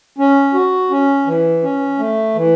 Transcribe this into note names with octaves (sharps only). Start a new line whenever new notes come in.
C#4
F#4
C#4
E3
C#4
A3
E3